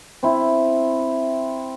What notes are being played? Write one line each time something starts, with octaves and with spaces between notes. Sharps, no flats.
C4 E4